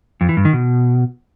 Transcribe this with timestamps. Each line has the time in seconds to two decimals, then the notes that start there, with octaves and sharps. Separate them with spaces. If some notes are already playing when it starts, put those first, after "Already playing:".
0.21 F2
0.29 E3
0.37 G2
0.45 D#3
0.53 B2